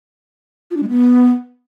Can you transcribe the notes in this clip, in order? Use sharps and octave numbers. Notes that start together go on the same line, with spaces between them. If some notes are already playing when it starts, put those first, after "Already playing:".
F4
D4
G#3
B3